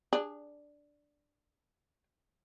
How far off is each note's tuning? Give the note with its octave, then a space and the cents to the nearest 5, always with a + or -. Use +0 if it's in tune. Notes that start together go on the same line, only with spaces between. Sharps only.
D4 +0 G#4 -20